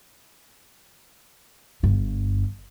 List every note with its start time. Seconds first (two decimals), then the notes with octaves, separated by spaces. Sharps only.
1.83 G1 G2